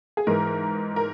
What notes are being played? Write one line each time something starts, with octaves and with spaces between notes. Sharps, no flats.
G#4
G#2 E3 G#3 A#4
A#4